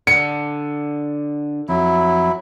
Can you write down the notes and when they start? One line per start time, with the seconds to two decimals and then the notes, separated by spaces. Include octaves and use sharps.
0.07 D3 C#7
1.69 F2 F#3 E4